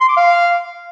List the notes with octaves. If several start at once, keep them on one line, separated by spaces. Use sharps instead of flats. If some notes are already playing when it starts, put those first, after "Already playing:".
C6
D6
F5